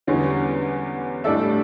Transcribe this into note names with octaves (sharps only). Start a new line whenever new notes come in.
E2 D3 G3 C#4
A2 G3 D4 A4 E5